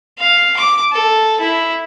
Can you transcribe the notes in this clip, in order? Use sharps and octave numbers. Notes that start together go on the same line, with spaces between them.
F5
D6
A4
E4